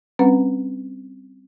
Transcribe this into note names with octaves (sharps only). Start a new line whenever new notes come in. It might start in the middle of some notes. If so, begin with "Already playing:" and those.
G3 C4 C#4 B4 F#5